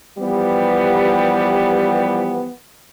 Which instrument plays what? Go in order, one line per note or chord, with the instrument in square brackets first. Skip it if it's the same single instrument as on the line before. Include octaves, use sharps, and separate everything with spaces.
[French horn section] E3 F3 G3 B3 G4